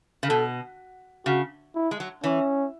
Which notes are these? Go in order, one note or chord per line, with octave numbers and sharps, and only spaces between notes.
C#3
B2 A4
C#3 F#4
E4
G#3
F#3
E3 C#4